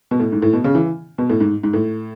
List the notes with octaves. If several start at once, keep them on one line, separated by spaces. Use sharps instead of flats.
B2
A2
G#2
A2
B2
C#3
E3
B2
A2
G#2
G#2
A2